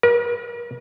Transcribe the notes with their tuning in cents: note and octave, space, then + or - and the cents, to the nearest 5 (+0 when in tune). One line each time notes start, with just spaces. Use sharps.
A#4 +45